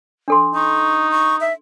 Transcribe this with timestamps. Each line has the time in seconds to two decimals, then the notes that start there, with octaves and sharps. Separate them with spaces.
0.28 D4 A4 C6
0.55 D#4 C#6
1.11 C#6
1.41 E5